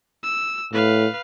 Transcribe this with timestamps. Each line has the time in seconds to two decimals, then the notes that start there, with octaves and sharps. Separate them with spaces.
0.23 E6
0.73 A2 B4 F5